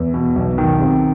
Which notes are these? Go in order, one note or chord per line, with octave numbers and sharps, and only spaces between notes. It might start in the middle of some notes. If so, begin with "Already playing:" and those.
Already playing: E2
B2
B1
D#3
C3